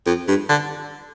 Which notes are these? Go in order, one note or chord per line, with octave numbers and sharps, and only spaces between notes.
F2
G2
D3